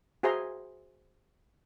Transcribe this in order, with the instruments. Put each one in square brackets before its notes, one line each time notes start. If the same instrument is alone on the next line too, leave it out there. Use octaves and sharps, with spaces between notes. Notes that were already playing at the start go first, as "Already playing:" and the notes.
[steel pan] F#4 G#4 C5 E5 A#5 C6